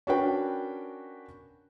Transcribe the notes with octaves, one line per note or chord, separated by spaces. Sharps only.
C#4 D4 F#4 A#4 B4 G5